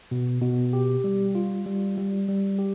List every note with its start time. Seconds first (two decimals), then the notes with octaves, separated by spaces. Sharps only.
0.11 B2
0.41 B2
0.73 G4
1.04 G3
1.35 F4
1.66 G3
1.98 G3
2.28 G3
2.59 G4